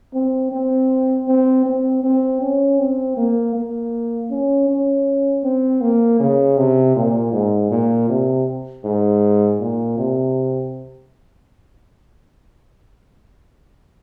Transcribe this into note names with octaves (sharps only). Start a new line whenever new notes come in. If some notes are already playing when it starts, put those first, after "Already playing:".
C4
C4
C4
C4
C4
C#4
C4
A#3
A#3
C#4
C#4
C4
A#3
C#3
C3
A#2
G#2
A#2
C3
G#2
A#2
C3